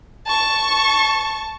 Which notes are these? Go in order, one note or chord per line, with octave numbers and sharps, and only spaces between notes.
A5 C#6